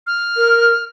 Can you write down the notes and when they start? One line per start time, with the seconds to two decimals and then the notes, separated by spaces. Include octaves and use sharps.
0.07 F6
0.36 A#4